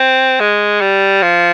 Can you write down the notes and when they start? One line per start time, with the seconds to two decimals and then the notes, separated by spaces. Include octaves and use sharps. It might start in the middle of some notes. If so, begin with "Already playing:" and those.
Already playing: C4
0.40 G#3
0.81 G3
1.22 F3